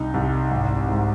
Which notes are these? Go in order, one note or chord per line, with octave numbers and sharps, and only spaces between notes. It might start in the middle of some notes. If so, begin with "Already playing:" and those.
Already playing: C2 D#4
C2
G#1
G#2